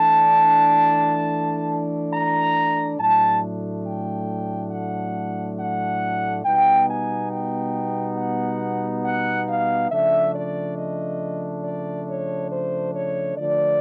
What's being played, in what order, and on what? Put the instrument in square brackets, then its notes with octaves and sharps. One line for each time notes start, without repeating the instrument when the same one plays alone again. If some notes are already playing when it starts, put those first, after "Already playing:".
Already playing: [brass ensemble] E3 A3 D4 A5
A#5
A2 F#3 A3 D4 A5
G5
F#5
F#5
B2 G3 B3 D#4 G5
G#5
G5
F#5
F#5
F5
C#3 F3 A3 D4 E5
D5
D#5
D5
C#5
C5
C#5
D3 F3 A3 D5